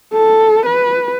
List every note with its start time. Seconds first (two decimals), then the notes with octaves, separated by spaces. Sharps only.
0.13 A4
0.66 B4